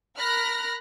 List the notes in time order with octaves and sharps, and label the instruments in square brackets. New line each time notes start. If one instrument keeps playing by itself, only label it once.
[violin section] A#4 B5 F6 F#6 A#6